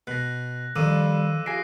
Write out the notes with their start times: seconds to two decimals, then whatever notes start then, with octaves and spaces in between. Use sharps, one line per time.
0.07 B2 F#6 A#6
0.76 F2 D#3 F3 G3 D6 E6 D#7
1.46 F4 G4 G#4 E5 G#5 A#6 C7 D7